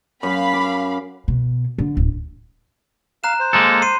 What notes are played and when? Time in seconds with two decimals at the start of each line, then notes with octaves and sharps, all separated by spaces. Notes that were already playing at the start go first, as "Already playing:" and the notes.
0.23 F#2 F5 B5
0.53 D6
1.28 B2
1.78 D3
1.97 D1
3.24 F5 A#5 F#6 E7
3.40 C5
3.53 G#3 A#3 A4
3.82 C6 C7 D#7